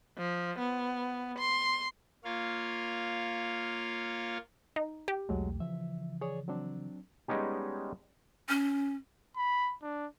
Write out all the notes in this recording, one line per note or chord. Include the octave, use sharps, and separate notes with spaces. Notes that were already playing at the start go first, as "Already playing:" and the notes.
F3
B3
C6
A#3 F4 C#5 F5
D#4
G4
B1 E2 F#3 G#3 A3
C#3 E3 F3 E5
G#4 C#5 D5
F#3 C4 D4
G3 G#3 B3 C#4 D#4 G4
C#4
B5
D4